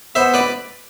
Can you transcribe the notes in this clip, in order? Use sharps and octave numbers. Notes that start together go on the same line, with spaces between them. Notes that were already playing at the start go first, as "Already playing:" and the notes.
B3 C5 E5
B4 D5